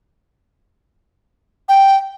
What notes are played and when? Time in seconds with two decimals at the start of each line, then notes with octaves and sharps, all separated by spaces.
1.69 G5